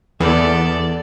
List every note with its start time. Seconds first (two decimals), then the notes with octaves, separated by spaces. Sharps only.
0.20 E2 B3 A4 D5